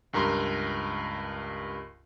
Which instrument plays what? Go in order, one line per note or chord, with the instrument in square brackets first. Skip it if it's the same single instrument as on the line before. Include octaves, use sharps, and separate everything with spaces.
[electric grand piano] C#2 G2 A#4 A#5 C6